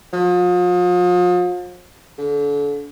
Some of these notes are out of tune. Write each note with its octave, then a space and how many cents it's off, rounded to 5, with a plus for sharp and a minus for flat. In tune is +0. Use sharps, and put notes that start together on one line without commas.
F3 +40
D3 -35